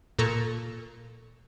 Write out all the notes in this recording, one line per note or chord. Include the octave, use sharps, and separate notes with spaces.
A#2 A4 A#5 C#6